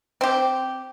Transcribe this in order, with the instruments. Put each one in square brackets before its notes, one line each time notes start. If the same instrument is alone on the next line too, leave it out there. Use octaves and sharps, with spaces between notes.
[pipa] C4 G4